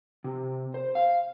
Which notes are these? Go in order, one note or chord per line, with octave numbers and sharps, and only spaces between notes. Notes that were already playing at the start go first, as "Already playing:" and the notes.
C3
C5
F5